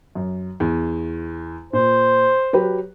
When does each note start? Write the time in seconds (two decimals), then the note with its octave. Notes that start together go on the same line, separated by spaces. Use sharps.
0.15 F#2
0.60 E2
1.73 A#2 C5
2.53 F#3 G4 B4